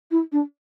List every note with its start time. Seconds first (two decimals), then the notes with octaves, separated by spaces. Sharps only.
0.11 E4
0.32 D4